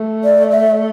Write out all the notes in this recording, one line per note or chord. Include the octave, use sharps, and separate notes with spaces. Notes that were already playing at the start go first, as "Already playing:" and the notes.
Already playing: A3
D5
E5